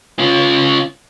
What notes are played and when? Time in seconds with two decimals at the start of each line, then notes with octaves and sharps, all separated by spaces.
0.19 C#3 F4